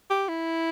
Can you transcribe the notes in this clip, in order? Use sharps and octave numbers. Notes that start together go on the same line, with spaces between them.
G4
E4